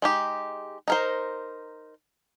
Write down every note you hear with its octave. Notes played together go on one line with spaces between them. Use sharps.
G#3 D#4 G4
D#4 A#4 C5